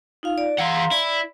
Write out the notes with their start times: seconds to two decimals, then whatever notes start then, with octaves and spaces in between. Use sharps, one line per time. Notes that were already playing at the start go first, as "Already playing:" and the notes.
0.23 D#4 F4 F5
0.38 D5
0.58 E3 F5 F#5 A#5 C6
0.91 E4 D5